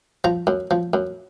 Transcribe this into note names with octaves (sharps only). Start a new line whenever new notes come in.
F3 A#5
F#2
F3
F#2